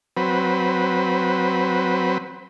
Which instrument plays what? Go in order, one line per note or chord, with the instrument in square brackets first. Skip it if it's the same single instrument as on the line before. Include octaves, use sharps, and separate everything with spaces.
[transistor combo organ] F#3 C4 B4